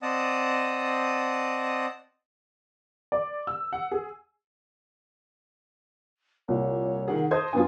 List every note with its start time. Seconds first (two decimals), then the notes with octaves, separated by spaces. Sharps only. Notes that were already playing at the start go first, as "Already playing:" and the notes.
0.02 C4 D5 D#5 F#5 A5 D#6
3.12 D5
3.47 E6
3.73 F#5
3.92 G#4
6.48 C2 A#2 C#5
7.08 D#3 G#4 F#5
7.31 A4 C5 D#5 D#6 G#6
7.53 F#2 B3 D4 F4 G#5